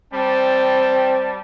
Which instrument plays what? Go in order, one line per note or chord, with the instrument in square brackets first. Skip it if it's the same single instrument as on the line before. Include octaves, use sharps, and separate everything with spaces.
[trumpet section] G3 A5 [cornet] C4